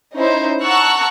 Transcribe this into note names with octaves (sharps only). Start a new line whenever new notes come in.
C#4 D#4 E4 C5
F#5 A5 A#5 C#6 E6 F#6